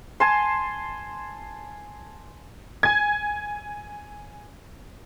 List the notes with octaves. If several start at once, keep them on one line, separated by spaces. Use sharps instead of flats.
G#5 A5 C6
G#5 G#6